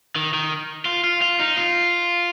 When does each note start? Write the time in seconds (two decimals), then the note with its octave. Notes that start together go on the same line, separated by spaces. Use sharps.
0.16 D#3
0.33 D#3
0.85 F4
1.04 F4
1.22 F4
1.40 D#4
1.57 F4